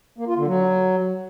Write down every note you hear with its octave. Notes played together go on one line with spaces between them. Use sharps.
A#3
F4
D3
F#3